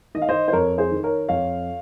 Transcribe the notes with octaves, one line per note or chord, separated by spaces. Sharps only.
D#3 D#5
F5
C5 D#5
C5
F2 A#4 C#5
G#4 C5
D#3
A#4 C#5
F2 C#5 F5